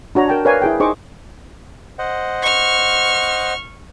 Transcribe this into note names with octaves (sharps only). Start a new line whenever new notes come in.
D4 F#4 C#5 A#5
A#4 G5 A5
A#4 B4 C#5 D5 F5 G#5
E4 G#4 G5
D#4 G#4 C5 D#5 C#6 D6
C5 D#5 F#5
C#6 F6